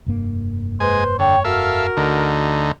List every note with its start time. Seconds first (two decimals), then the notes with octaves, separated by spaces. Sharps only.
0.06 F1 G2 A#3
0.80 G#3 B4 C5 G#5
1.19 D3 C#5 G5
1.45 F#4 A4 A#4 E5 F5
1.97 D2 D3 D#4